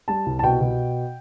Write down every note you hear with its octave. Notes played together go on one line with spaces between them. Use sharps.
G3 A5
C2
A5
B2 G5
B2